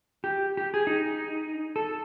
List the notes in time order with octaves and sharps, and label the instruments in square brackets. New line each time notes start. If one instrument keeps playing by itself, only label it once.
[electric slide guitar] G4
G4
G#4
D#4
A4